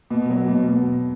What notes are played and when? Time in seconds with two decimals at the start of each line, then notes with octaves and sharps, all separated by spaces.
0.10 B2
0.30 F#3
0.48 B2
0.67 B2